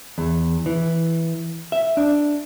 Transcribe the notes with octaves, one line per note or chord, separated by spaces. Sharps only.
E2
E3
E5
D4